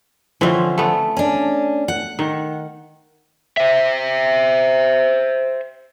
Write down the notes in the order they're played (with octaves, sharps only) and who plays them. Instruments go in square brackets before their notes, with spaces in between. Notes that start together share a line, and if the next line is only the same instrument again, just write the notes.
[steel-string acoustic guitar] D3 F3 [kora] E3 C4 C#4
[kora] A3 B3
[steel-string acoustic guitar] C#4 D4
F#5
[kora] D#3
[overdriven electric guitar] C5 E5